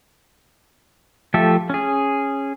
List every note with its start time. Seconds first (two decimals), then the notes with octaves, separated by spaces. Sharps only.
1.34 F3 A3 G4 A4 E5
1.70 C#4 G#4